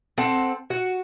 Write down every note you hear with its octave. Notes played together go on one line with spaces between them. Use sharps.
C4 A4 F#5
F#4